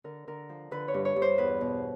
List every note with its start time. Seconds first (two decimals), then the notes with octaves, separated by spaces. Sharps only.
0.04 D3 A#4
0.27 D3 A#4
0.49 F3
0.71 D3 B4
0.88 C#5
0.94 G2
1.05 C#5
1.16 G2
1.22 C5
1.38 E2 B4
1.61 B2